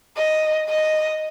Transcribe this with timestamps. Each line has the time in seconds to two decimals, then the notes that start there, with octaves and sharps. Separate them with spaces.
0.17 D#5
0.70 D#5